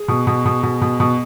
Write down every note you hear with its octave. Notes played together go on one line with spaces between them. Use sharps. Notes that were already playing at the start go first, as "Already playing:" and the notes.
Already playing: G#4
B2
B2
B2
B2
B2
B2